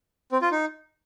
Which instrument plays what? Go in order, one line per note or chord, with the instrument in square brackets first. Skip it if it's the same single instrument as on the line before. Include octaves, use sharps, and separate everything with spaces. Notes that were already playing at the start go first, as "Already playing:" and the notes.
[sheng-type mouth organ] C4
F4
D#4